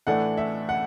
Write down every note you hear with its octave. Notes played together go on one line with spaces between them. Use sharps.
A2 E3 A3 D4 F#5
E5
F#5